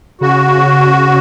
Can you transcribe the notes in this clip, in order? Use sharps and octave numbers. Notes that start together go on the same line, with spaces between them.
C#3 F#4